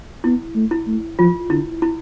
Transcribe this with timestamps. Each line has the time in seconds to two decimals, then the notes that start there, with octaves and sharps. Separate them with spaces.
0.24 B3 E4
0.55 A3
0.71 E4
0.87 A3
1.19 F3 F4
1.50 D3 E4
1.82 E4